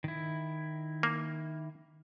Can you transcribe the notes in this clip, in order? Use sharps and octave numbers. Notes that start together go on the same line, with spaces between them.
D#3 E4
A#3